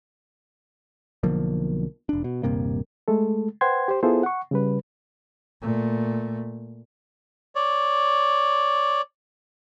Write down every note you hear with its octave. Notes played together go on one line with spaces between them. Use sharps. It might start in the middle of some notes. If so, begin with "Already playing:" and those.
B1 D3 F3 A#3
E1 D4
B2
D#1 G2 C3 A#3
G#3 A3 A4
B4 C5 F#5 G5 C6 G#6
G4 C5
B3 E4 F4 G#4 A4 C5
F#5 C#6
C#3 G3 B4
A#2 A3
C#5 D5